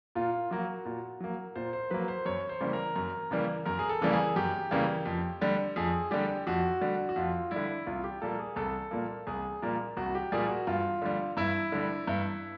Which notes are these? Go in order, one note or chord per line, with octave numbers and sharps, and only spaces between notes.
A#2 F4
F#3 A#3 F#4
A#2
F#3 A#3
A#2 C5
C5
F#3 A#3 B4
C5
F#2 C#5
C5
C#3 E3 G3 A#3
A#4
F#2
C#3 E3 G3 A#3
F#2 A#4
G#4
A4
C#3 E3 G3 A#3
G#4
F#2 G4
C#3 E3 G3 A#3
F2
D3 G3
F2 G#4
D3 G3 G4
F2 F#4
D3 G3
F#4
F2 F4
D3 G3 E4
C2 F4
G4
A#2 G3 A#3 A4
G#4
C2 A4
A#2 G3 A#3
C2 G#4
A#2 G3 A#3
C2 F#4
G4
A#2 G3 A#3 G#4
F#4
G2 F4
D3 G3
G2 E4
D3 G3
G2